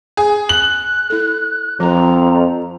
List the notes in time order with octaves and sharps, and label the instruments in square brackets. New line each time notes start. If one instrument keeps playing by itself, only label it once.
[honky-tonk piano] G#4
[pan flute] F#6 [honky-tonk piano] F#7
[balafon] E4 A4
[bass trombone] F2 [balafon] F3 [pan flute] A#5